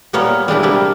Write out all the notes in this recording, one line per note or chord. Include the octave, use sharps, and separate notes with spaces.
A#2 G3 A#3 B3 C#5
G3 G#3 D4 E4
C3 G3 A#3